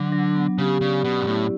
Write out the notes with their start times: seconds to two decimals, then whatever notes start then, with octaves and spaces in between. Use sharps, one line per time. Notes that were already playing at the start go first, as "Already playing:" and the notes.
Already playing: D3 F#3 D4
0.12 F#3
0.35 B3
0.58 C#3 G4
0.81 C#3 D5
1.04 B2 C#4
1.21 G2
1.27 A2 E4